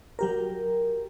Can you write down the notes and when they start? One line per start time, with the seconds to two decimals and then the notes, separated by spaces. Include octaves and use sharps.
0.19 F#3 G4 A#4